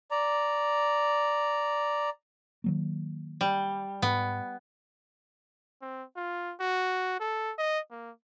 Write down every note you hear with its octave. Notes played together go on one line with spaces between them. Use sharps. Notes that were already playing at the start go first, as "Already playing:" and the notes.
D5 A#5
D#3 F#3 A#3
G3
G#2 B3
C4
F4
F#4
A4
D#5
A#3